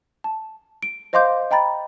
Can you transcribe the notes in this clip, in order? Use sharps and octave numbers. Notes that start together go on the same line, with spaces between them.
A5
D7
C5 D#5 F5 C6 D6 G6
D#5 G5 A#5 B5 A6